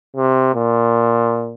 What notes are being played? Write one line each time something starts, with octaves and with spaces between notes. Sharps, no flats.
C3
A#2